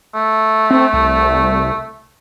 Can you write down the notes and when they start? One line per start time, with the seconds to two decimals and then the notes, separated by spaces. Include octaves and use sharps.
0.14 A3
0.70 C4
0.93 C2